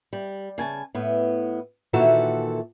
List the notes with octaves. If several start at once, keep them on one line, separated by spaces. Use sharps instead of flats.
G3
C#3 G#5 A5
A2 B3
A#2 D#3 E3 F#4 A4 E5